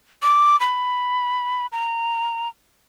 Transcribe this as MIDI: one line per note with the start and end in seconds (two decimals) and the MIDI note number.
0.23 0.59 86
0.60 1.67 83
1.72 2.48 82